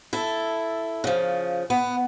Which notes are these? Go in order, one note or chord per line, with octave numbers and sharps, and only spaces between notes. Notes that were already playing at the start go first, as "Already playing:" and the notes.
E4 A4
C#3 F3
B3